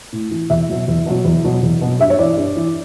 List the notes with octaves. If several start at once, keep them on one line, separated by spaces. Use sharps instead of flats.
A2
E3
E2 E5
B2 F#3
E2
B2 F#3
E2
B2 F#3
E2
B2
F#3
G2 E5
C#5
E3 D5
G2
E3